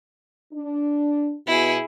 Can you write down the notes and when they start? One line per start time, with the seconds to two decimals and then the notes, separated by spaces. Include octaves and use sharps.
0.54 D4
1.47 B2 E4 G#4